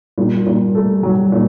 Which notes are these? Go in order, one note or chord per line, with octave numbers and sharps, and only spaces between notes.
A#2 G3
A#2
A3
F#3
A#2